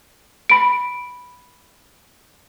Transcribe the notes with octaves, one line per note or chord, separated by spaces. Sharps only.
B5 D7